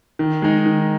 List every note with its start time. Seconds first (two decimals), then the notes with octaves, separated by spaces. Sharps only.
0.19 D#3
0.42 G#3 D#4
0.66 D#3